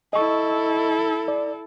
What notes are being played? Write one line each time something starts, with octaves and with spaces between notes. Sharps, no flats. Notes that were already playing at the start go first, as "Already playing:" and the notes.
E4 A4 D#5 C#6
D5